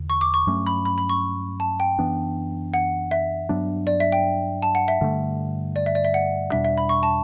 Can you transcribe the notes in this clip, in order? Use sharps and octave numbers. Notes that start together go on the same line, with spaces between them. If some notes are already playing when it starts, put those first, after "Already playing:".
Already playing: E2 D3
C#6
D6
C#6
G2 F#3 A3 C#4
B5
B5
B5
C#6
A5
G5
F#2 E3 B3 D4
F#5
E5
G2 F#3 B3 D4
D5
E5
G5
A5
F#5
E5
G2 D3 A3
D5
E5
D5
E5
F#5
E2 B2 G3 D4 E5
E5
B5
C#6
A5